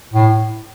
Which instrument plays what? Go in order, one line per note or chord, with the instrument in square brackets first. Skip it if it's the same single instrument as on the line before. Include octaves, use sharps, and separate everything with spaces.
[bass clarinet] A2